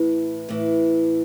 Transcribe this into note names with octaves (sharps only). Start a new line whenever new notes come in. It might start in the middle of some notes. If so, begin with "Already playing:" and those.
Already playing: A2 E3
A2 E3